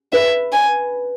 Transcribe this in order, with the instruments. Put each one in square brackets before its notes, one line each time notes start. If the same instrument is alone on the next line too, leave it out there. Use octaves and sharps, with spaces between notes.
[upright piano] B4 [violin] E5
[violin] G#5